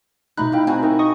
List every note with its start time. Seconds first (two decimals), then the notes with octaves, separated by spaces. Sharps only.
0.37 B2 A3 D#4 B5 F#6
0.52 E4 F5 G5
0.67 C4 F#4 G#5 A#5
0.83 D#4 A#4 E5
0.99 D#5 C#6 D#6